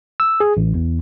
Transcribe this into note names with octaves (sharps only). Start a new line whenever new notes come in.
E6
G#4
A1
E2